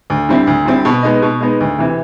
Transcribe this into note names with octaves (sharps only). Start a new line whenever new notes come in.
D2
D3 G3 C4 E4
D2
D3 G3 C4 E4
B2
G#3 B3 D#4
B2
G#3 B3 D#4
D2
C3 E3